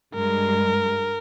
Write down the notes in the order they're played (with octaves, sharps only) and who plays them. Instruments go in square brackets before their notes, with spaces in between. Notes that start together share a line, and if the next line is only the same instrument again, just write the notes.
[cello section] G2 G#3 [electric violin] A#4